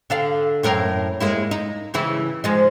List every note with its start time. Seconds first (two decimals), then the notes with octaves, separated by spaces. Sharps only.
0.10 D3 A4 F5
0.63 F#2 A2 A#4
1.20 G#3 A#3 E4
1.51 D#4
1.94 C#3 E3 E4
2.44 F3 G#3 D#4